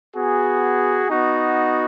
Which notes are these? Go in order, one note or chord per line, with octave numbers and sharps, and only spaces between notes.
B3 F#4 G#4
B3 D#4 F#4